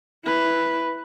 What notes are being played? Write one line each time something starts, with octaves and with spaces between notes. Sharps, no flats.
E4 B4